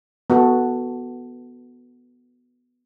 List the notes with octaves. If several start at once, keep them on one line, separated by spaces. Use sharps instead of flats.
B3 F#4 A4